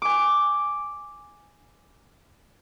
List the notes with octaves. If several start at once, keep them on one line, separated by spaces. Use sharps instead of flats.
G#5 D6